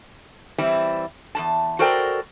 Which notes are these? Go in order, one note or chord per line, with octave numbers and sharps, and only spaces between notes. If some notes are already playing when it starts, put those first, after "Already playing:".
E3 G3 C4 E4
E2 G2 A5
F#4 A4 A#4 C5 D5 G5